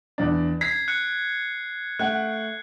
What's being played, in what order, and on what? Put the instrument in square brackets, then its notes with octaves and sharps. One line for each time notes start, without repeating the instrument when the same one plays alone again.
[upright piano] E2 D4
[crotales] G#6 C7 [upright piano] B6
[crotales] F#6 C#7
[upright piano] A3 F#5 [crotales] F#6